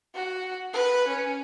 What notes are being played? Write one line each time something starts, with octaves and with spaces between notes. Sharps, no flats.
F#4
B4
C#4